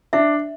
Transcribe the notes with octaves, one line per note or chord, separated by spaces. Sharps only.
D4 E5